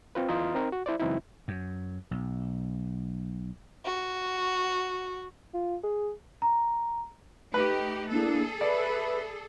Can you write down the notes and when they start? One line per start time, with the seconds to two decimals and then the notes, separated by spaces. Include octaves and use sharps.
0.15 C4 F4 B4
0.29 E2 E3 F4 D#5 A#5 D#6
0.55 C4 D#4 A#4
0.72 F#4
0.86 E4 C5 D5
0.99 C#2 F#2 E3 C4 D#4 E4
1.48 F#2
2.11 B1
3.85 F#4
5.54 F4
5.83 G#4
6.42 A#5
7.54 A3 D#4 G4 B4
8.11 A#3 D4 E4 G#4 A4
8.61 B4 D5 E5 B5